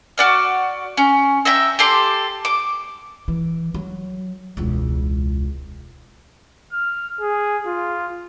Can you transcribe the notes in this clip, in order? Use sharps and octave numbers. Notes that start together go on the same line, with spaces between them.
F#4 D5 F6
C#4
E5 G5 A#5 E6
G4 A4 C6 D6
D6
E3
F#3
E1 C#2
F6
G#4
F4